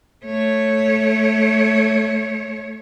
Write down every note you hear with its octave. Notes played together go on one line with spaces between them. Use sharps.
A3 C#5